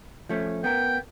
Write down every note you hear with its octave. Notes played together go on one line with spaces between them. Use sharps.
F3 A3 C#4
B3 A#4 G5